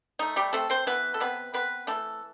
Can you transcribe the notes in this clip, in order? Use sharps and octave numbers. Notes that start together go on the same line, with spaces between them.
A3 D#4
G3 G4
A3 C4 A4
C4 C5
E3 B3 B4
A4
C3 B3 B4
B3 C4 B4
E3 A3 A4